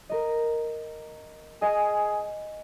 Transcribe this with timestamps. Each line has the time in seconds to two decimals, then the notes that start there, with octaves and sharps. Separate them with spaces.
0.10 A#4 D#5
1.62 G#4 D#5 G#5 F6